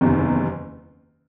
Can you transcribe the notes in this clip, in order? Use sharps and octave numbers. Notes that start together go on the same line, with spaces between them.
F#1 E2 C3 D#3